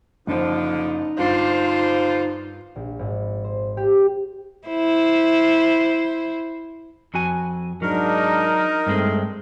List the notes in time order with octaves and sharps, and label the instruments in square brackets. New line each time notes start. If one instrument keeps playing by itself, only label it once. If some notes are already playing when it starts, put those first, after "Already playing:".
[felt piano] F#1 C5 [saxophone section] D3 F3 [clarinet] D#4
[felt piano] G2 [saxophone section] D3 G3 C5 [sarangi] F4
[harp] A#1
G#1
C5
G4
[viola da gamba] E4 C5
[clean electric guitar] F2 F#4 G#5
[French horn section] G#2 D4 [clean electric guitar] F#3 [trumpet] D#4 [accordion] A#4
[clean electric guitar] G2 G#3 [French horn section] A3 C4